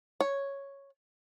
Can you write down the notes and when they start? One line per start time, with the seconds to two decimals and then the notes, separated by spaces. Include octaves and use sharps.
0.21 C#5